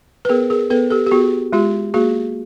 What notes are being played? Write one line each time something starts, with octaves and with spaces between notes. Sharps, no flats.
B4
B3 G#4 A#4
G#4 A#4
B3 A4 B4
G4 A4
G4
B3 F#4 G#4
G#3 F4 G4
A#3 F#4 G#4